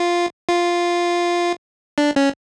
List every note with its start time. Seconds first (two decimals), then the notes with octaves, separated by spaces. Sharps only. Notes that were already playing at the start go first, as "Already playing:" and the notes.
Already playing: F4
0.49 F4
1.98 D4
2.16 C#4